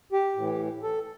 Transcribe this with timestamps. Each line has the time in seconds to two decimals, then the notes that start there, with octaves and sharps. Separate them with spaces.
0.12 G4
0.36 A2 E3
0.83 A4